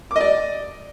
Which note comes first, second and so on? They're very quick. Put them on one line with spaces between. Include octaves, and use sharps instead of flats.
D6 D#5 D5